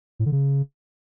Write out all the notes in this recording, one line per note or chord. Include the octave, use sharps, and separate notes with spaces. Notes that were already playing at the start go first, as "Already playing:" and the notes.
A2
D3
C#3